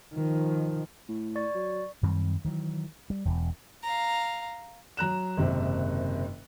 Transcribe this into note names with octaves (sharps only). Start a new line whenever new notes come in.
D#3 F3
A2
D5 C#6 A6
F#3
F#2 D#3 G3 C4
D#3 E3 F#3
G3
E1 E2
F5 A#5
F#3 A#5 F#6 E7
F#1 G#2 C3 D#3